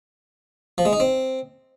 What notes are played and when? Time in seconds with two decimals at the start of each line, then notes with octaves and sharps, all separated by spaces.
0.78 F3
0.85 G#3
0.93 D#4
1.00 C4